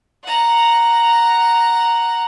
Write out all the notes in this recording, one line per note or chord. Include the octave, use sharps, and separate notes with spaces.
F#5 A#5